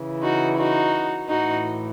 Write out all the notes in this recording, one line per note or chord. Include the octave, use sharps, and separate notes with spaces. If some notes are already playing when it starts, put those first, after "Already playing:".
Already playing: C#3 E3
D#4 F#4
D#4 F#4
A2 E3 D#4 F#4